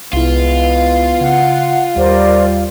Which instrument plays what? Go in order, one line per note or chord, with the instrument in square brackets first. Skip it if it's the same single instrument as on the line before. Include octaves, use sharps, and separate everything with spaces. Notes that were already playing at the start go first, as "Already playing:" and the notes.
[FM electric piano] C2 E4 [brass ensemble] G#3 B3 B4 [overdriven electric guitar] F4
[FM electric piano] C#3 [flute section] F#5
[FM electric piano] D#2 [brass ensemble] G3 [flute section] A#4 C5 D5